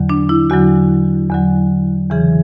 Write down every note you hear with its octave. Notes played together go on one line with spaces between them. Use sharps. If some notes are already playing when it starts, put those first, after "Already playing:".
Already playing: E2 D3 F#3
D4
E4
E2 D3 F#3 F#4
E2 D3 F#3
E2 C#3 E3 G#4